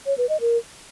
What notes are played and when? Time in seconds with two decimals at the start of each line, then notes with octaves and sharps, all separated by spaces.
0.06 C#5
0.18 B4
0.29 D#5
0.41 A#4